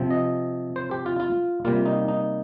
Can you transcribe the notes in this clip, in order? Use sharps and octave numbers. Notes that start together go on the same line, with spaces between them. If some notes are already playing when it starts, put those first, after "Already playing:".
Already playing: C3 F3 C4
D#5
C5
G4
F4
F4
C3 G3 A#3 F4
D#4
D#4